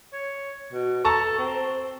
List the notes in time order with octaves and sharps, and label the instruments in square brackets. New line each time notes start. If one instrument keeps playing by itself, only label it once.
[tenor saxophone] C#5
B2
[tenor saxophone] A4 [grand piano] A5 A#5 C#6
[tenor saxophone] C4